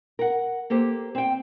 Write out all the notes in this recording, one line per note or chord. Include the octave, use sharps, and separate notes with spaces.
A#4 F#5
A#3 G4 A4 C5
C4 G5